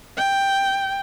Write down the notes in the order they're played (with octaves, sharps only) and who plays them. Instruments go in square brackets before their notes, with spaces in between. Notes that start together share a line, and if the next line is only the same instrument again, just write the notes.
[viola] G5